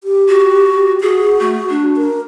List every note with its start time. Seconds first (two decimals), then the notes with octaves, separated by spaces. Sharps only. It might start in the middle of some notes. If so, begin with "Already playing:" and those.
0.04 G4
0.29 F#4
1.02 F#4 G#4
1.41 A3
1.70 D4
1.97 A#4